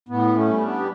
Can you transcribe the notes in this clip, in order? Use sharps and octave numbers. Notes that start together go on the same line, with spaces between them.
A2 B3
A3 C#4
G3
B3 D4
G4